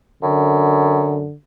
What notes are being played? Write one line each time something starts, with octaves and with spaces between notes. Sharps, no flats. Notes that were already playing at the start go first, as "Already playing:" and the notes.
F#2 D3